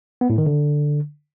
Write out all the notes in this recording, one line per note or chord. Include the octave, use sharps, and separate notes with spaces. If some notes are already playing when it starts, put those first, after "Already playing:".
B3
A2
D#3
D3